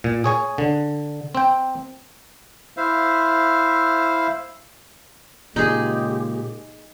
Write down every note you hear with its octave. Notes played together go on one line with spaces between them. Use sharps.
A#2
G#4 C#5 G#5
D3
C4 G5
E4 C5 E5 F5
A#2 C#3 G#3 D#4 G4 G#4